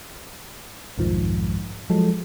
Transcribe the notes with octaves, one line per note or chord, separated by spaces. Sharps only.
B1 F2 G#2 D#3 F3
F3 F#3 G#3 A4